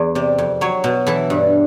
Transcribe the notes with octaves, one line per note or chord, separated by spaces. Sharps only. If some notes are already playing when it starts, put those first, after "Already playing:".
Already playing: E2
C3 D5
F2
F#3 C#5
B2
E3 A4
G2